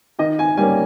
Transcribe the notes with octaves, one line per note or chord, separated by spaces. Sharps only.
D#3 D#5
G#5
G3 A#3 C#4 G#5